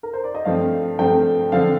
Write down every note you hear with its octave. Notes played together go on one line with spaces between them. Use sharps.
A#4
C5
D5
D#5
G2 F3 A3 C4 F5
G2 F3 A3 C4 G5
D3 F3 C4 F5